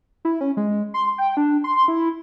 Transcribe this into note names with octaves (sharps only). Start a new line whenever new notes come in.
E4
C#4
G#3
C6
G5
D4
C6
E4